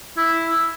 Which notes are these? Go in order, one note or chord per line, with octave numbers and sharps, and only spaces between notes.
E4